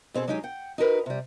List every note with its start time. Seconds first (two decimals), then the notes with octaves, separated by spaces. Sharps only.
0.14 B2 C4 G#4 A4
0.28 F#3 G#3 D#4 G4 G#4
0.43 F#5 G5
0.78 D#4 F#4 A#4 B4
1.06 C3 G3